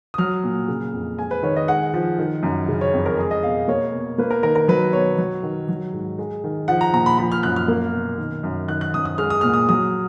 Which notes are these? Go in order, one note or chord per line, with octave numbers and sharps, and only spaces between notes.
D#6
F#3 F6
A#2
C#3
F2
G#3 G#5
B4
D#3 C#5
D#5
G#3 F#5
F3
D#3
F#2
C#3
C#5
F2
A#4
G#3 G#4
D#5
B2 F5
A#3 C#5
B2
A#3 B4
A#4
D#3 A#4
A#4
F#3 B4
B2 C#5
F#3
D#3
F#3
G#2
G#3
D#3
F3 F#5
A#5
A#2 A#5
B5
F3 B5
F6
F#2 F#6
F6
A#3
B2
D#3
F#2
D#3 F#6
F#6
F#2 D#6
D#6
G#3 F6
D#6
A#2 F6
D#6
F#3 D#6